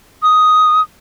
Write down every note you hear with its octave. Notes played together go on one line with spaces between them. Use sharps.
D#6